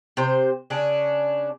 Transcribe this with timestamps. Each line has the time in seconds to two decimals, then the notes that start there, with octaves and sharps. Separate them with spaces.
0.17 C3 C5
0.70 C#3 C#4 D4